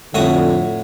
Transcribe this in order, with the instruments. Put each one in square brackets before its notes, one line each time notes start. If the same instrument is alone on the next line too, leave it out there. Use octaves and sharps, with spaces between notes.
[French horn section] F2 D3 [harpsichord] A2 F#4 D#6